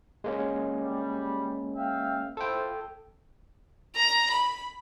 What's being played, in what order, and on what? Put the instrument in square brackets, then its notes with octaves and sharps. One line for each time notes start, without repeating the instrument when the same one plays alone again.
[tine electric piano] G#3 A#3 C#4
[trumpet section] G3
E5 F5 G5
[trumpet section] E4 F4 C5 [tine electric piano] A4 G5
[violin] A#5
B5